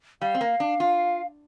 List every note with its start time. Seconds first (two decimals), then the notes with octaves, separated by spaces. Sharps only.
0.21 G3 F5
0.35 C4
0.41 A#3
0.60 D4
0.80 F4